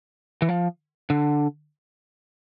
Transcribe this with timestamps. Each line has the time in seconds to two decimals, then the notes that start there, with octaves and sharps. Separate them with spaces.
0.42 E3
0.49 F3
1.10 D3